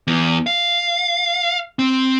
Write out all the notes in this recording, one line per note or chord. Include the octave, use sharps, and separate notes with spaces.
E2
F5
C4